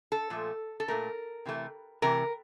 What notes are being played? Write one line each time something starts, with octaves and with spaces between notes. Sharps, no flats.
A4
A#2 F3 A3
A4
A#2 F3 A3 A#4
C3 E3 A3
C3 E3 A3 A#4